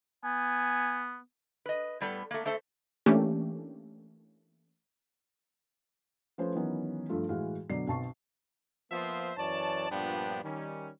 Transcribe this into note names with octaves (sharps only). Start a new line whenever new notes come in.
B3 G#5
B4 D#5
A2 G3 B3 A4
A3 A#3
A3 A4 C5 E5
E3 A3 A#3 C#4 D4 G4
F3 A3 C#4 B4 C5
D#3 E3 F#3 B3 C#4
G2 F3 A3 F4
A2 E3 G#3 F#4 F5
B2 D3 F#3 D5 C7
B1 C4 A5 C#6 C7
F3 A#3 B3 F4 C5 E5
F#2 E3 C#5 D5 A5
G2 A#2 F3 B3 D4 G5
D#3 G3 C#4